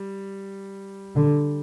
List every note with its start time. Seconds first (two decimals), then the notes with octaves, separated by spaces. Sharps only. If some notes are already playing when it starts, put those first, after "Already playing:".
Already playing: G3
1.16 D3